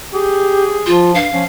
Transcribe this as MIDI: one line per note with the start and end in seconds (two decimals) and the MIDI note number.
0.13 0.81 67
0.13 0.94 68
0.86 1.16 53
0.86 1.11 65
1.15 1.28 43
1.15 1.44 77
1.33 1.46 53
1.33 1.44 61